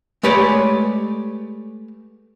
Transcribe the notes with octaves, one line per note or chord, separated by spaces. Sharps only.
G#3 A3 G4 B4 C#5 D5